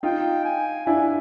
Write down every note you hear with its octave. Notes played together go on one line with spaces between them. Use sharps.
D#4 F4 G5
G#5
D4 E4 G#5